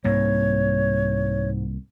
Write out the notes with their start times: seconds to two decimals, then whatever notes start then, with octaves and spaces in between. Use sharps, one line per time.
0.04 C2 G#2 A#3 C#5